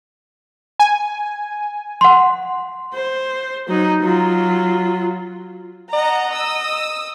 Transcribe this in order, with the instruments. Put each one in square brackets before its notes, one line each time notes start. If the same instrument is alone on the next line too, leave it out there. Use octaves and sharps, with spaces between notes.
[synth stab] G#5
[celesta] F#5 C6
[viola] C5
F#3 D#4
F#3 F4
[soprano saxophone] D#5 [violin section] F#5 A5 A#5
[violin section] D#6 E6